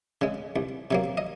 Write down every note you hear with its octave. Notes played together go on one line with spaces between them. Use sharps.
C#3 G#3
C2
C3 F#3 A#3
D#5